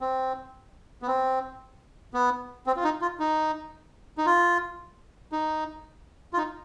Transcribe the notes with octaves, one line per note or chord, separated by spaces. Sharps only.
C4
B3
C4
B3
C4
F4
D#4
F4
D#4
D#4
F4
D#4
F4
D#4